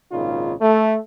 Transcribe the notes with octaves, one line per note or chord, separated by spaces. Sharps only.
G#1 A#2 C#3 D#4 F4
A3